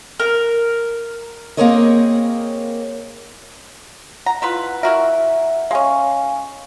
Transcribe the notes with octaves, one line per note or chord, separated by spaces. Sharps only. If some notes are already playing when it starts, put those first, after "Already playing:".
A#4
A#3 C4 G#4 A#4 C#5 D#5
F#5 A#5
E4 F4 B4
E4 F#4 A#4 E5
G#3 C#4 F5 G#5